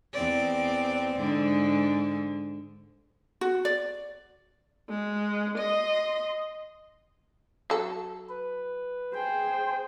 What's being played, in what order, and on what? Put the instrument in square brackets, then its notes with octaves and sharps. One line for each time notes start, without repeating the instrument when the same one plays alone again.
[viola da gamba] E2 C4 D5
G#2 D3
[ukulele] F#4
D5
[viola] G#3
D#5 C6
[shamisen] F#3 A4
[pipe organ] B4
[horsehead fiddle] G#4 C5 [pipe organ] G5